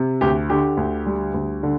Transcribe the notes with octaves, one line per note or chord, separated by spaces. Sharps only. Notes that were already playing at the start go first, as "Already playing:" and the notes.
Already playing: C3
D2 G4
D3 G4
D2
G3
D2
D3